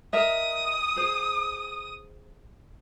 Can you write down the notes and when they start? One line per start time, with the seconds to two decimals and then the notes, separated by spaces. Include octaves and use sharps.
0.13 A#4 D#5 E5 D#6
0.96 G#4 C5